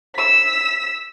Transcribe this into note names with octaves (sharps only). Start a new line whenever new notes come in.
E6 B6